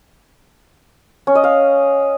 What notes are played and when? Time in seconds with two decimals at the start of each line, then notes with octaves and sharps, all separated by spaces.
1.27 C#4
1.35 D#5
1.44 F5